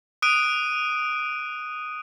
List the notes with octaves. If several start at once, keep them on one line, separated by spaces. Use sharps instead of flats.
D#6 F#6 D7 D#7